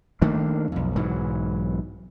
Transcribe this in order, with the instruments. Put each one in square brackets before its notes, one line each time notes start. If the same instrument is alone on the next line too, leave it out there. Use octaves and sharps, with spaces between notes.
[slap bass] D#3 A3 A#3 D4
B1 F2
B1 G#2 E3 F#3